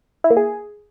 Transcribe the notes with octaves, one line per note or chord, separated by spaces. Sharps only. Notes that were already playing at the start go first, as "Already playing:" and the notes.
E4
A#3
G#4